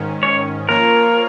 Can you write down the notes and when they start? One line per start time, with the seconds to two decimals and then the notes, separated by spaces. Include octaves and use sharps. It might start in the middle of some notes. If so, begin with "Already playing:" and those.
Already playing: G#2 D#3 C#4
0.23 C#5
0.68 F3 A#3 F4 A#4 C#5